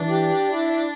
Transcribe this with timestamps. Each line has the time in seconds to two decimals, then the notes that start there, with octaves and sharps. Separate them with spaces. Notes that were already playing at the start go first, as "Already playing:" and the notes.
Already playing: E3 D4
0.08 G4
0.29 D5
0.48 E4
0.68 D5